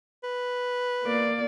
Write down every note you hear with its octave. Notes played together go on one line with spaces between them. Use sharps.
B4
A#3 D5